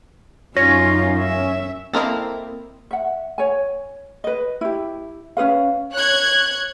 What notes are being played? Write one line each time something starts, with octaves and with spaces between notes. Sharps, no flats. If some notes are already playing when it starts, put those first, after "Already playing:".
F#2 C#4 D#4 F4 A#6
E5
A#3 C4 E4 A4 A#4 D#5
E5 F#5
C#5 G#5
B4 D#5
E4 G4
C#4 G#4 B4 F5
C#5 F#6 G#6